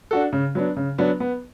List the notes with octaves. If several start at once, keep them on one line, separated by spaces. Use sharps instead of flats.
D4 F#4 A4
C#3
F#3 B3 D4
C#3
F#3 B3 D4
B3